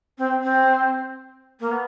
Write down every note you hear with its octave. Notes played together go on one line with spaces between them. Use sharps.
C4
C4
A#3
B3